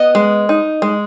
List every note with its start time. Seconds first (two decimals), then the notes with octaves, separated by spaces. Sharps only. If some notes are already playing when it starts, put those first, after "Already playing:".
Already playing: B3 D#5
0.15 G#3
0.49 D#4
0.82 G#3